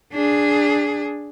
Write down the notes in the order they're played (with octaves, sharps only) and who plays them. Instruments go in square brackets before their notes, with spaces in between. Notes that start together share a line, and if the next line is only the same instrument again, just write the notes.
[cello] D4 G#4